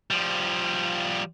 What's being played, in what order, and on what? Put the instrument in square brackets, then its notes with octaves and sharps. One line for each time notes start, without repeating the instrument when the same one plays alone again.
[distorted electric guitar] F3 G3